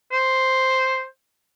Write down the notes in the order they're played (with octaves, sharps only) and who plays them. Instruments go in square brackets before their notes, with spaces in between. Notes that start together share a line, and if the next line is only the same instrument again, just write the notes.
[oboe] C5